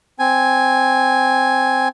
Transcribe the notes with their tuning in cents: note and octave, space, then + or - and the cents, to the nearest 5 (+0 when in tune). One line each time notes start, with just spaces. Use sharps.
C4 +0 G#5 +0